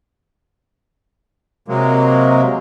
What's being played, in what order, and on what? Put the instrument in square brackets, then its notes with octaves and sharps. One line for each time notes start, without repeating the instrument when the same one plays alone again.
[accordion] C3 F#3 G#3 A#3